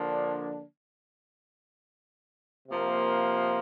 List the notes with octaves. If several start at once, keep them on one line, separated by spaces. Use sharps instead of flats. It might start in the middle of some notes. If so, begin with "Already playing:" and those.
Already playing: D3 F3 A#3 D4
C3 F3 A#3